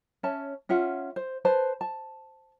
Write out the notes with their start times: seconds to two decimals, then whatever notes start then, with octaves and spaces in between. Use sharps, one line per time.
0.23 C#4 C#5 E5 A5
0.69 C#4 F4 E5 F#5
1.16 C5
1.45 B4 C5 A5
1.81 A5